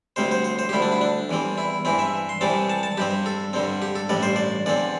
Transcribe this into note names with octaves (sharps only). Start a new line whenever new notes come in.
D2 C3 G3 C4 C5
C5
C5
C5
G4
D2 D3 G3 E4
D4
E4
D4
E2 E3 G3 C4
E4
G2 E3 C4 E4
E5
C6
C2 C3 E3 G3 C4 A5
A5
A5
G2 G3 C4 G4
A4
G2 D3 G3 C4
G4
A4
A1 G2 G3 D5
C5
D5
E2 D3 C4 D5